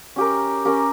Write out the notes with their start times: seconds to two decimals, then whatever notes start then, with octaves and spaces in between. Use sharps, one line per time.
0.16 C#4 G4 A#4
0.65 C#4 G4 A#4